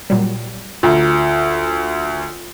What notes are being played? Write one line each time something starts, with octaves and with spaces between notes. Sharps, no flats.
A#2 F#3 G3
D2 F4